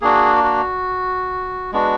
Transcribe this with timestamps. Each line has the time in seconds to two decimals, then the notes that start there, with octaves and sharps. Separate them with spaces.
0.01 A#3 D4 F#4 G#4
0.44 F#4
1.72 G#3 B3 D4 F#4